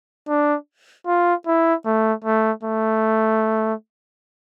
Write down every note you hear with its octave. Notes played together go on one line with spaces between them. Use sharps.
D4
F4
E4
A3
A3
A3